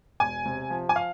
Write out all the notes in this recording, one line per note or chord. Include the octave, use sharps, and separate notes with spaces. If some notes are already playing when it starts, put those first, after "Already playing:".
E1 G#5
C3
F3
G#5
F5